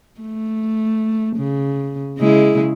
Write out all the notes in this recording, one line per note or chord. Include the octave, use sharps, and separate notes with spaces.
A3
C#3
C#3 G#3 E4